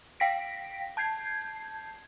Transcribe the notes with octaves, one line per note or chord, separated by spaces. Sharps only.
F5 G5 A#6 B6 D7
A5 G6 G#6 C7